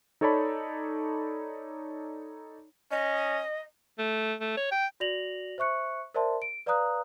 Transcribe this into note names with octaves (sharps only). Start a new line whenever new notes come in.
D#4 A4 C#5 D5 A5 B5
C#4 D#5
A3
A3
C#5
G5
F#4 D5 A#6 F7 F#7
C5 E5 C#6 F#6 C#7
A#4 C5 D5 E5 A5 C6
D7
B4 D5 F5 A#5 D#6 F#6